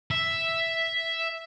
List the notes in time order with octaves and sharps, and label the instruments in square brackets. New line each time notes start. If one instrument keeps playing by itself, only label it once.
[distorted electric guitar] E5